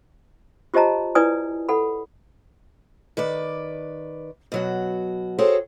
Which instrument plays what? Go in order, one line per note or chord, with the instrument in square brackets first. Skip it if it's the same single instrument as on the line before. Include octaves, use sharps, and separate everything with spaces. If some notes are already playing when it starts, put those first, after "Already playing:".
[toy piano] F4 G4 C5 D#5 A5 A#5
E4 B4 D5 G#5 D#6
A4 F#5 B5
[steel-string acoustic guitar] D#3 B4 D5
B2 F#3 F#4
F#4 G#4 A4 C5 C#5 G5